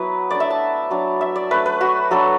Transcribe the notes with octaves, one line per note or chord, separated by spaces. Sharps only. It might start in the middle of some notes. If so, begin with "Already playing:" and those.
Already playing: F#3 B3 E4 B4
A3 D4 D5
E5
A5
F#3 D4
E5
D5
A3 D4 B4
B4
F#4
F#3 D4 A4